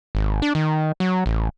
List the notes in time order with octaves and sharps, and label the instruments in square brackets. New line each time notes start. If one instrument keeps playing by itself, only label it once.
[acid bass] G#1
D4
D#3
F#3
A1